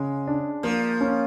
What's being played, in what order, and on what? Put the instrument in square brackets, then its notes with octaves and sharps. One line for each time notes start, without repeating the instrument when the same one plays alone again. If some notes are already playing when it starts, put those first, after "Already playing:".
Already playing: [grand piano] C#3 [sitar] G#3
[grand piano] D4
[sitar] F3 [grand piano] A#3
[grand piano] C#4